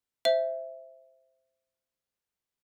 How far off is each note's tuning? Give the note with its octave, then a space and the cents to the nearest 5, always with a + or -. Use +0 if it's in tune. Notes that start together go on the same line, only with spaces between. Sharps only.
C5 +0 E5 +0